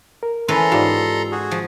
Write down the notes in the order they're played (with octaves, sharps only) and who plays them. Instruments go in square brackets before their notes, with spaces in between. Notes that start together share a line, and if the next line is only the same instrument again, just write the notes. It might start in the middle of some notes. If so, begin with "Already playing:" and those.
[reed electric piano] A#4
[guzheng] E3 C#4 B4 [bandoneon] A4 A#5 C6
[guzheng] G#2 [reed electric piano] F4 G4 D5
[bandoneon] F#4 G#4
[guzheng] F3